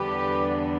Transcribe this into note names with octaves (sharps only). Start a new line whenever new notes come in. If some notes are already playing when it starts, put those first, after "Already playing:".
Already playing: E2 D3 G3 B3 D4 G4 B4